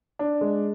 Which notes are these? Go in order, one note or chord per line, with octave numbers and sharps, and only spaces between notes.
D4
G#3